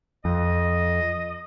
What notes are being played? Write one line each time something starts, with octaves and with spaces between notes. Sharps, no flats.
F2 D#5